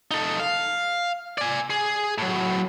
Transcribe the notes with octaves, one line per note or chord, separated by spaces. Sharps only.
D#4 A4
F5
D5 G#5
G#4
A2 F#3